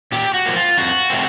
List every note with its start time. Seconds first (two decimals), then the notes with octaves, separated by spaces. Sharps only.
0.12 A#2 G4
0.34 F#4
0.45 F3 A#3
0.56 F4
0.77 F2 F#4
1.10 C3 A3 C4